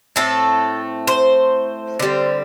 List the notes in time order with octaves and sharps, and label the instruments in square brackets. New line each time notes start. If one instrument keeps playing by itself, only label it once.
[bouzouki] A2 A3 C4 A4
C5
D3 G3 C4